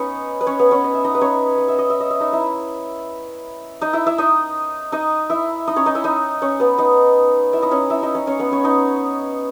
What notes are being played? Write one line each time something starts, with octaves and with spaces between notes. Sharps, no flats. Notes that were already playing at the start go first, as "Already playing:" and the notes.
Already playing: B3 C#4 D#4 B4 C#5 D#5
B4
C#4 C#5
B3 B4
C#4 C#5
D#5
E5
D#4 D#5
B4
C#4 C#5
D#5
E5
D#5
E5
D#5
E5
D#4 D#5
E4 E5
D#4 D#5
E4 E5
E4 E5
D#4 D#5
D#4 D#5
E4 E5
D#4 D#5
C#4 C#5
D#4 D#5
E4 E5
D#4 D#5
C#4 C#5
B3 B4
D#4 D#5
E4 E5
D#4 D#5
C#4 C#5
E4 E5
D#4 D#5
C#4 C#5
C#4 C#5
B3 B4
C#4 C#5
D#4 D#5